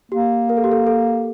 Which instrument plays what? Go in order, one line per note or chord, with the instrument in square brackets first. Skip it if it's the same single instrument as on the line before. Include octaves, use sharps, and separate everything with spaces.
[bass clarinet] A#3 [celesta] G4
[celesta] A#4
A4
G4
A4
A4